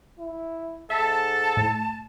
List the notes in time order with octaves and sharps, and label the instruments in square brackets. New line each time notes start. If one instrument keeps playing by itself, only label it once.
[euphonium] E4
[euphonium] G#2 [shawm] A4 [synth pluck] E5 [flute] A5
[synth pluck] A2